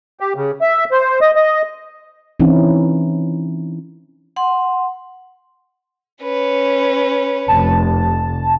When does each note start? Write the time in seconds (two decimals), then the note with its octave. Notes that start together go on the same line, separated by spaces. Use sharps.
0.20 G4
0.36 C#3
0.61 E5
0.91 C5
1.21 D#5
1.35 D#5
2.40 E3 C4 C#4 D#4 E4
4.36 F#5 C6
6.23 C#4 B4
7.48 F1 A5